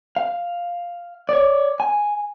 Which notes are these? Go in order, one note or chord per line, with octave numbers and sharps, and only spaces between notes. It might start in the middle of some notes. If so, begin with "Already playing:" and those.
F5
C#5 D5
G#5